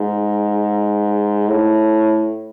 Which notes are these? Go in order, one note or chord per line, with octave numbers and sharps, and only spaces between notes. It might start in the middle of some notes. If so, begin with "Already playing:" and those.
Already playing: G#2
A2